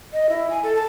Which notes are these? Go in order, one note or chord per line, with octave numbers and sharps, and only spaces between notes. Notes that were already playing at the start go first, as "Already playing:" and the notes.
D#5
E4
G#5
A4
A5